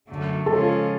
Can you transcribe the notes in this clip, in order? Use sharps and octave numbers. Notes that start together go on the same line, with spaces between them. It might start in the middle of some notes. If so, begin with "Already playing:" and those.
F#2 D3 F#3 A3
C#3 F3 G#3 C#4 F4 A4